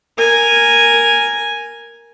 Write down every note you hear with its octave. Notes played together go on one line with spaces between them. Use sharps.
A#4 G#5